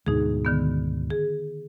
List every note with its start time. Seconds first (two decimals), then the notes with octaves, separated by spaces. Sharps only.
0.06 D2 G#2 B2 D#4 G#4
0.45 D3 D#3 B3
1.10 G#4